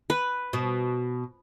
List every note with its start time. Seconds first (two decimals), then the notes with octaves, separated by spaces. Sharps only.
0.10 B4
0.53 B2